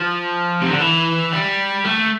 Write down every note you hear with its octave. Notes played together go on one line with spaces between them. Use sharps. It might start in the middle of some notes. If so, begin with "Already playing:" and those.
Already playing: F3
C3
D3
E3
G3
A3